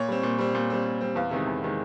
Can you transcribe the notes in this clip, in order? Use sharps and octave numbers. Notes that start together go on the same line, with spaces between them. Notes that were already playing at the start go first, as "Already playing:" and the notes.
Already playing: A#2 C#5
G3 C4
A#2
G3 C4
A#2
G3 C4
A#2
G3 C4
E2 F5
C3 D#3 G#3
E2
C3 D#3 G#3